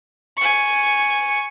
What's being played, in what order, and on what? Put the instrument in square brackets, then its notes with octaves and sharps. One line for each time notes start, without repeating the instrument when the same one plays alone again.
[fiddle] G#5 C#6